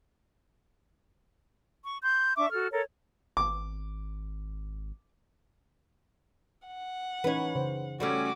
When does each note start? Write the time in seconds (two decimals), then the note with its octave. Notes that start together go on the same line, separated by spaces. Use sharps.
1.84 C#6
2.02 C6 G6
2.37 D4 E5 C#6 D6
2.52 F#4 A4 F6
2.72 A4 A#4 C#5
3.37 G#1 D6
6.67 F#5
7.24 E3 C#4 D#4 B4 C#5
7.55 C#3 C5
8.00 G3 A3 C#4 F#4 D6